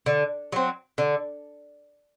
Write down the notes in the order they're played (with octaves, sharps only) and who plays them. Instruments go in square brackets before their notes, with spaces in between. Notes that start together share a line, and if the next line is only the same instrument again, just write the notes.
[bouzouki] D3
F#3 C4
D3